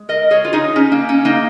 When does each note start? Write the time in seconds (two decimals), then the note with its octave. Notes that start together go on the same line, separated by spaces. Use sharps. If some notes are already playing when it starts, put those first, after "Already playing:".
Already playing: G#3
0.09 A#4 D#5
0.31 G#4 C#5
0.45 F4
0.53 D#4 G#4
0.76 C#4
0.92 A#3
1.09 C#4
1.25 A#3 D#4